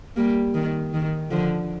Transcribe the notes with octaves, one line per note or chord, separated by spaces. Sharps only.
G3 A#3
D#3
D#3
D3 F3